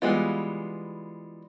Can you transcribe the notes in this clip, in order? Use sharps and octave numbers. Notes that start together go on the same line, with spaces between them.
E3 G3 G#3 B3 F4